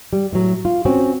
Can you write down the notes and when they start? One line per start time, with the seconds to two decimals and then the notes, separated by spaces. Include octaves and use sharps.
0.13 G3
0.32 A2 F#3
0.65 F4
0.85 C4 C#4 F#4